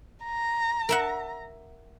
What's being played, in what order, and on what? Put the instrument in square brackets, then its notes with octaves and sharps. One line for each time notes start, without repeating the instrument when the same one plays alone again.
[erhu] A#5
[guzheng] A#4 E5 F#5